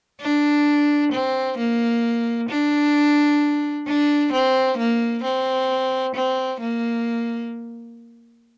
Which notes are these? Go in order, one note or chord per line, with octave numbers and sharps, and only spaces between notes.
D4
C4
A#3
D4
D4
C4
A#3
C4
C4
A#3